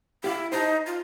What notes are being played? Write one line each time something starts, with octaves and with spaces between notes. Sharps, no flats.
E4 G4 F5
D#4 C5 D#5 A5
F4